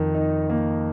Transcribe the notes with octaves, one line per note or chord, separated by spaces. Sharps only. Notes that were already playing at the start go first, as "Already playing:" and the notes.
Already playing: F2 D#3
D#4
A#3